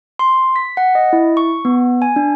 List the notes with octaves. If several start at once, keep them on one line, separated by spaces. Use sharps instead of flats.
C6
B6
F#5
D#5
E4
C#6
B3
G#5
D4